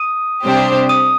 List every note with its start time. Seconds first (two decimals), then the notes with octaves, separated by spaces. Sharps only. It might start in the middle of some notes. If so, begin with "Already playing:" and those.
Already playing: D#6 D#7
0.44 C3 G3 D4 G4 C5
0.89 D#6 D#7